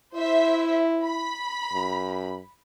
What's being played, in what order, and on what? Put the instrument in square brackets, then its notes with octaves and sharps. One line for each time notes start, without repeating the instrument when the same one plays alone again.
[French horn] E4 [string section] C5 E5
[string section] B5
[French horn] F#2